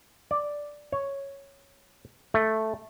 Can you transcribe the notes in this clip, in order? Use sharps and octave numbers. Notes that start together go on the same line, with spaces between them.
D5
C#5
A3